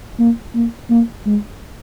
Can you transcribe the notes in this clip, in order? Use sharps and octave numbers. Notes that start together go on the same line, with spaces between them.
A#3
A#3
A#3
G#3